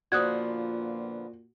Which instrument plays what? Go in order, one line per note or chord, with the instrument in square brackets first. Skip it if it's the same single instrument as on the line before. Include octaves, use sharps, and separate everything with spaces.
[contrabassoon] A#2 [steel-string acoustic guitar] D3 F3 B3 [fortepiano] F#4 [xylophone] D#6 F#6 G#6